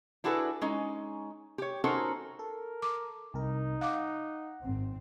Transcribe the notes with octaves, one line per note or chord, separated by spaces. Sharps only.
D4 E4 F#4 G#4 A4 B4
G#3 C#4 D#4
G4 C#5
C#4 D#4 F#4 A4 A#4 C5
A4 A#4
D6
C2 D#4 A#4
F5 F#5 D6
G#1 C4